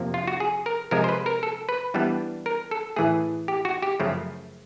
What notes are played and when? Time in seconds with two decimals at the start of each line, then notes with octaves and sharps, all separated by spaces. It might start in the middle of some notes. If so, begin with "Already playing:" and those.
Already playing: F2 C3 F3 A#3
0.14 F4
0.27 F#4
0.40 G#4
0.66 A#4
0.91 C3 F3 G#3 A#4
1.04 C5
1.09 B4
1.26 A#4
1.43 A4
1.69 B4
1.94 E3 G3 B3 D4
2.46 A#4
2.71 A4
2.96 A2 E3 A3 G#4
3.48 G4
3.65 F#4
3.82 G4
4.00 F#2 C#3 F3 A3